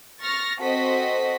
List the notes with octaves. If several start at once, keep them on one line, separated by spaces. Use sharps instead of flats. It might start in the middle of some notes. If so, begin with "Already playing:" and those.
C#6 F6 A6 A#6
C4 F#4 A4 C5 D#5 B6